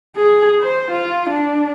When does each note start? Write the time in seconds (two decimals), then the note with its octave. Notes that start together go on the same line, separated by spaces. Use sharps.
0.16 G#4
0.61 C5
0.92 F4
1.30 D4